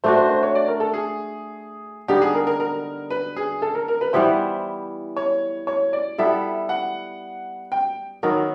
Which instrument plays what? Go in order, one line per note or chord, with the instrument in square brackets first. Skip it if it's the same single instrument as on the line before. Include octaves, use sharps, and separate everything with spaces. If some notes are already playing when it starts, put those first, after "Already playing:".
[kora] A3 D4 F#4 [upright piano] C5
[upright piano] C5
C5
C#5
D5
A#4
A4
G#4
[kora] D3 G3 B3 D#4 [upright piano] G4
[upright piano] G#4
A#4
A#4
A#4
B4
G#4
A4
A#4
A#4
B4
[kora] E3 G3 B3 E4 [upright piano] C5
[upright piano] C#5
C#5
D5
[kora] G3 B3 E4 A4 [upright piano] E5
[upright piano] F#5
G5
[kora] D#3 F#3 B3 [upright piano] A#4